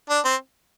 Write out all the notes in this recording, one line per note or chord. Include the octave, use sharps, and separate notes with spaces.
D4
C4